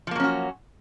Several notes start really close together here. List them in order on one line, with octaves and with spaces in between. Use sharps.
F3 A#3 F#3 C#4 F#4